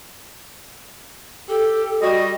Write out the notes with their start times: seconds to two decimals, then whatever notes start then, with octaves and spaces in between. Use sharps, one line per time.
1.49 G4 A4
2.02 G3 F#4 D#5